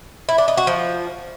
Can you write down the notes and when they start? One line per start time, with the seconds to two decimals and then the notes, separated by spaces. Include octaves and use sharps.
0.29 E4
0.38 D4
0.48 D#4
0.58 F#4
0.67 F3